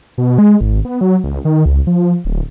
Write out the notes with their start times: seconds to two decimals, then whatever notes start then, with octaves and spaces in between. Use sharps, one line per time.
0.18 B2
0.38 G#3
0.61 G#1
0.85 B3
1.01 F#3
1.24 C#2
1.45 D#3
1.66 C#2
1.87 F3
2.25 D1